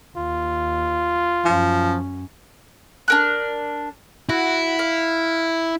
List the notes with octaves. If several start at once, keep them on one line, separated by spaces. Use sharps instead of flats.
D#2 F4
F#2 F3 C#4
D4 A#4 F#6
E4 F#4
F5